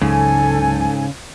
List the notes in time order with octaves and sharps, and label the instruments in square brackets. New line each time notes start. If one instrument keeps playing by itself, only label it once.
[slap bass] C#2 F#3 [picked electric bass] G#2 [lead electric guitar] C#3 [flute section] A4 G#5